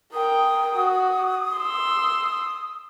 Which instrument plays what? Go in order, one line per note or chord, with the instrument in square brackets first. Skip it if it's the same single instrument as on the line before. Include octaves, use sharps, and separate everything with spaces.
[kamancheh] A#4 G5 [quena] D#6
[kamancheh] F#4
C6 E6